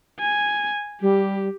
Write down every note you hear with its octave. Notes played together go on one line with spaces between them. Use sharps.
G#5
G3 G4